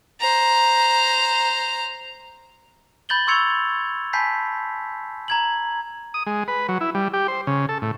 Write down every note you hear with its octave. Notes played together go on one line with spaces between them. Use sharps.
C5 A#5
B5 G6 A6 F#7 G7
C6 C#6 E6 G#6 C#7 F7
G#5 A5 B5 G6 B6 C7
A#5 G#6 F#7
D#6
G#3
B4
F#3
E4
G3
G4
C5
C#3
A4
A2